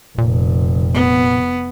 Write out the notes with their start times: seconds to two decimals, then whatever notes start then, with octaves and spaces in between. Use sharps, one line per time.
0.18 F1 A#2
0.94 B3